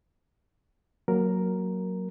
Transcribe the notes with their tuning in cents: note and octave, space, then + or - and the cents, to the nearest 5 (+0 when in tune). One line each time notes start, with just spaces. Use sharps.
F#3 +0 A#3 +0 A#4 +0